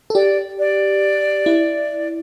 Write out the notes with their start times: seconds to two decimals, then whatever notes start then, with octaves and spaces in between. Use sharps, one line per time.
0.10 A4
0.15 G4 D5
0.59 D5
1.46 E4